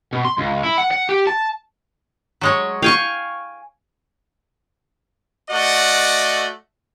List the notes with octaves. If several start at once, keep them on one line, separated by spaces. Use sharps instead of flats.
B2
C6
C#2
E4
F#5
F#5
G4
A5
F#3 G#3 C#5
F5 G5 G#5 C#6
A3 F#4 D5 D#5 F#5